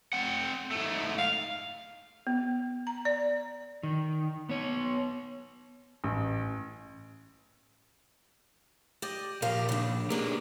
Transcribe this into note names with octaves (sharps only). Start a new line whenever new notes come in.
C4 F#5
G#2 A3
F5
B3
A#5
D5
D#3
B3 C#5
A1
G4 D5 D#5
A#2 F3 G4 A#4 F5
C#3 D4
A#3 D4 G4 G#4 B4